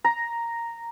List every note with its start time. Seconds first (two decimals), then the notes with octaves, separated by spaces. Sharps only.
0.04 A#5